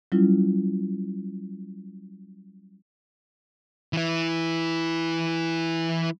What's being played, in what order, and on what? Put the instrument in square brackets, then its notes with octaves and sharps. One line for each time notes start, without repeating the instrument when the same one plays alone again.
[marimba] F#3 G3 C#4 E4 F4
[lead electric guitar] E3 E4